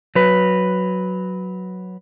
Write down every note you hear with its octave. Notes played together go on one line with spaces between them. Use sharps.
F#3 B4